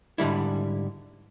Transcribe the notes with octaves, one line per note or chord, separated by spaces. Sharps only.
G#2 D3 G3 E4